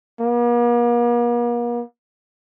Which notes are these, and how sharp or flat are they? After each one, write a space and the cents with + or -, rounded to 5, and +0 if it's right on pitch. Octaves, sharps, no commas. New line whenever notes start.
A#3 +45